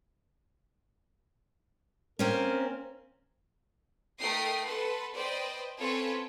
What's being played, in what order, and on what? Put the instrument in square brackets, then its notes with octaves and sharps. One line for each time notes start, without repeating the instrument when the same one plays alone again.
[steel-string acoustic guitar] A#3 C4 C#4 [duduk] A#4
[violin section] A3 D#4 A#4 G5 D#6 C7
A4 B4 F#5 C6
B4 C5 D5 D#5 G5
C4 C#4 F4 A4 B4 C#5